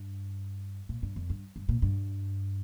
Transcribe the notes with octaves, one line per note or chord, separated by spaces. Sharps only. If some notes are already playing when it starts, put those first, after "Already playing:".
Already playing: G2
A#2
G2
F2
G2
G2
A#2
G2